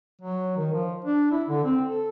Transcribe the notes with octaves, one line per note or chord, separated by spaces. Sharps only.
F#3
D#3
F3
D4
E4
D3
C4
A4